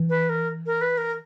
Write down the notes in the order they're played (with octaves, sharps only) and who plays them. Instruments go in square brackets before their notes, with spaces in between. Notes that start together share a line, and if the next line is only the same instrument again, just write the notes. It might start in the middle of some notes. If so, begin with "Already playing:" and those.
Already playing: [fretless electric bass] E3
[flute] B4
A#4
A#4
B4
A#4